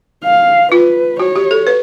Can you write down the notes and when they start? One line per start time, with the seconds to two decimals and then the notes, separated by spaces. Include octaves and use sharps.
0.24 F5
0.72 F4 B4
1.20 F#4 C#5
1.36 G4
1.51 A4
1.67 B4